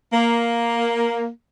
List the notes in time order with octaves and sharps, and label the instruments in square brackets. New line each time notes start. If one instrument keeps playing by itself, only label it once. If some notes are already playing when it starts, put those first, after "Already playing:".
[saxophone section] A#3